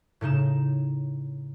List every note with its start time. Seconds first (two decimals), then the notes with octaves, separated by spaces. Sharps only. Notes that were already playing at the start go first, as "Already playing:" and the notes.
0.21 A2 C#3 D#4 E7